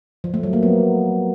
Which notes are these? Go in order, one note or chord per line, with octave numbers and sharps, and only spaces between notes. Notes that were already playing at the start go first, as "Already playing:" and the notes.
F3
A3
F#3
A#3
B3